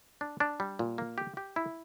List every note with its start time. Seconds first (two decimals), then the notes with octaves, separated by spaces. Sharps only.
0.21 D4
0.40 D4
0.60 G3
0.79 A#2
0.98 A#3
1.18 G4
1.37 G4
1.56 E4